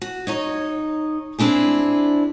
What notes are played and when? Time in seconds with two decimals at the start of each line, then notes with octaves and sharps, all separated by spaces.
0.02 F#4
0.27 D#4 C#5 D#5
1.39 C4 D4 E4 G#4